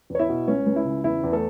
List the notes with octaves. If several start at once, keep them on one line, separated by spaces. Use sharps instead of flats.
E2 C#5
E4 E5
B2
C#2 C#4
C#2
E4
C#3
E2 E4
E2
A3 A4